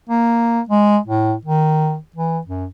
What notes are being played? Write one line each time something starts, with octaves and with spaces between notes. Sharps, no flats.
A#3
G#3
A2
D#3
E3
F#2